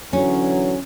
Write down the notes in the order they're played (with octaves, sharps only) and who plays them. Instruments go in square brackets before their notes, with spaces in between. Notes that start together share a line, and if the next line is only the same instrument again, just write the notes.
[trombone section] D3 E3 F#3 [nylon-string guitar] C#4